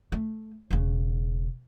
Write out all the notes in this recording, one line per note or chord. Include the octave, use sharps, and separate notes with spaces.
A3
E1 C#3